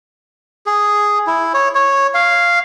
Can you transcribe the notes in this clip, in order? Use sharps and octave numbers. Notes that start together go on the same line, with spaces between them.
G#4
E4
C#5
C#5
F5